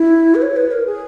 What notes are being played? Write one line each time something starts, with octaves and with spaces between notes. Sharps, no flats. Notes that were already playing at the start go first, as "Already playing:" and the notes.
Already playing: E4
B4
C#5
B4
A#4
G#4